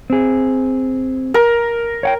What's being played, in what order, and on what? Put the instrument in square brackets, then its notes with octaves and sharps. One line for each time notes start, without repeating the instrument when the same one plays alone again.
[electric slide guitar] C4 G#4
[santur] A#4
[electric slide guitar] C#5 F#5 G5